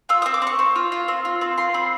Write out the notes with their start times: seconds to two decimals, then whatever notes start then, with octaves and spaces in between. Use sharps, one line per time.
0.09 F4 E6
0.22 C4 D#6
0.34 D6
0.42 C4 C#6
0.59 C4
0.76 F4
0.92 F4
1.08 C4
1.25 F4
1.41 C4
1.58 F4 C6
1.74 C4 B5